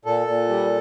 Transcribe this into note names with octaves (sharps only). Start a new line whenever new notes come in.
A#2 A4
A#2
G3